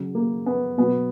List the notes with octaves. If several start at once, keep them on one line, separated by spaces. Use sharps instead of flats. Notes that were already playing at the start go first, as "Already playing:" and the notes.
Already playing: C#3 F#3
A#3
B3
B2 F#3 B3